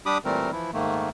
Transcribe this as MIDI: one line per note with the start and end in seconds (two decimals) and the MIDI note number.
0.06 0.18 55
0.06 0.18 62
0.06 0.18 67
0.06 0.18 83
0.06 0.18 86
0.06 0.18 87
0.25 0.51 46
0.25 0.51 52
0.25 0.51 55
0.25 0.51 57
0.25 0.51 60
0.25 0.51 70
0.52 0.71 52
0.52 0.71 53
0.52 0.71 64
0.73 1.09 44
0.73 1.09 51
0.73 1.09 57
0.73 1.09 58